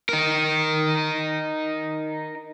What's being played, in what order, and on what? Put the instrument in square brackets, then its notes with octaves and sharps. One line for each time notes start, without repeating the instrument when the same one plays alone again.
[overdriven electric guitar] D#4 A#4